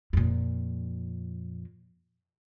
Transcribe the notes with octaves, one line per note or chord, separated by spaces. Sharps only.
F2 A#2